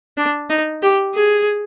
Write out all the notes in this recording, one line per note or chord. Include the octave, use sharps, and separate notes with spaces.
D4
D#4
G4
G#4